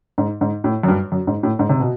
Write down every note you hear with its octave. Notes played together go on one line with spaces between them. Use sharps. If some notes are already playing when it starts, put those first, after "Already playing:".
G#2
G#2
A2
F#2
G2
F#2
G#2
A2
G#2
C3
B2